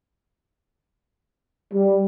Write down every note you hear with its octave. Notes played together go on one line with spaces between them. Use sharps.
G3